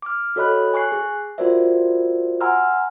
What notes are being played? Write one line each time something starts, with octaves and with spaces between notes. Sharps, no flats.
D6 F6
F#4 A4 C#5 D#5 B5 F#6
G#5 C#6 F#6 C7
G#4
F4 F#4 A#4 C5 D5 E5
F#5 G#5 A#5 C6 E6 F6